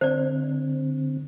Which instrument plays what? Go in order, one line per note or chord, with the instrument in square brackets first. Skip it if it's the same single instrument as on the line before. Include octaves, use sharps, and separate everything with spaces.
[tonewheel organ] D3 C4 [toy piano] C5 D5